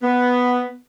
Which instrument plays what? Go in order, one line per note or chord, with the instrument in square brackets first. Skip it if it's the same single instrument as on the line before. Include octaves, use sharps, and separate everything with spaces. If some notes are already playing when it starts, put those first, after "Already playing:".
[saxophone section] B3